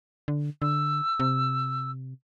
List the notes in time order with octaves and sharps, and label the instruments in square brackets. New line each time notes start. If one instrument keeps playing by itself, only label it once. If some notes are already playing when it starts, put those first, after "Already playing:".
[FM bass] D3
[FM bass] D3 [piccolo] E6
[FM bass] C3